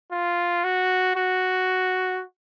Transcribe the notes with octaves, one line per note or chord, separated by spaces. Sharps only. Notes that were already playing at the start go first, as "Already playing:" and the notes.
F4
F#4
F#4